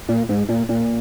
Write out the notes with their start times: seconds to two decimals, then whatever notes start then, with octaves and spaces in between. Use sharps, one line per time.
0.09 A#2
0.29 G#2
0.49 A#2
0.69 A#2